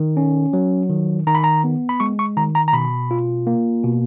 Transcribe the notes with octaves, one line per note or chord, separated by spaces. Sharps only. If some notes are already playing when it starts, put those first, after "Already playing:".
Already playing: D#3
C#4
F#3
D#3
D#3 A#5
B5
A#5
B3
B5
G#3 C#6
C#6
D#3 A#5
A#5
A#5
B2 B5
F4
A#3
B2